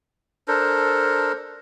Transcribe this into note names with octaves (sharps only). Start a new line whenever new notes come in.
D4 A4 A#4 C5